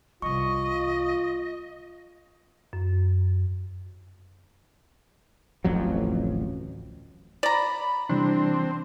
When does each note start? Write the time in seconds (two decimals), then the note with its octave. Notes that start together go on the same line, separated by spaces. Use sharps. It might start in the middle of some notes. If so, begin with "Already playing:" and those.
0.22 C2 E3 F4 D#5 C#6
2.73 F#2
5.64 D1 A1 F2 F#3
7.43 D5 A#5 B5
8.09 C3 E3 G3 C4 D4